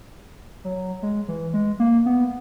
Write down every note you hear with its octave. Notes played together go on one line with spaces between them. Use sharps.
F#3
G#3
E3
G#3
A#3
B3